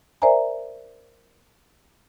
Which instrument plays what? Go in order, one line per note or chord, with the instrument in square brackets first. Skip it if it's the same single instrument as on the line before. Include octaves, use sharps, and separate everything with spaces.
[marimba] A#4 C5 D5 E5 G#5 A#5